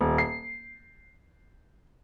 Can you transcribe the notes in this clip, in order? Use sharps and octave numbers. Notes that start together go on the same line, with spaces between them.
D#1
C7